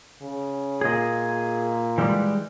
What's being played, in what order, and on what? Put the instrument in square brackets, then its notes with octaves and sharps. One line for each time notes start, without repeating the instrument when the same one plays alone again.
[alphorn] C#3
[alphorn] A#2 [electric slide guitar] G#4 D#5
[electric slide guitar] E3 G3 G#3